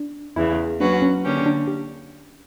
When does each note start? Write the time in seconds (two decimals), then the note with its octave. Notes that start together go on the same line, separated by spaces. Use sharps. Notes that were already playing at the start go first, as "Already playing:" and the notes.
Already playing: D4
0.36 E2 C#3 E3 E4
0.80 F#3 A#3 C#4 D4 F#4 B4
1.02 C#4
1.24 D3 A#3 C#4 G4
1.46 D4
1.67 G4